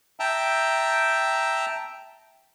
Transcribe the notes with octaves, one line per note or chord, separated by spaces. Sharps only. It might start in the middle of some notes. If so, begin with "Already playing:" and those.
E5 G5 A5 A#5